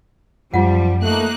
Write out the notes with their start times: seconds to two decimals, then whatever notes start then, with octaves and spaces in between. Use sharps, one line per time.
0.54 F#2 F3 G3 F4 F#5
1.03 A3 A#3 D#4 F#6